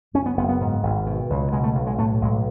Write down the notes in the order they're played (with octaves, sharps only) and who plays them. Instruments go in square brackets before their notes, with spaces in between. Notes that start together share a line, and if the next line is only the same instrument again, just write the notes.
[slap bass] F#1 C#4
B3
F#1 B3
B3
G#2
G#1
B2
C#2
B2 G#3
A3
B1
G#3
A2 A3
B1 G#3